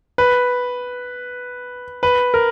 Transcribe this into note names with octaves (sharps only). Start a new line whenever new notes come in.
B4
B4
A#4